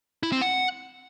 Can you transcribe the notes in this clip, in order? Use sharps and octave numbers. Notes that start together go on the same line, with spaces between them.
E4
C4
F#5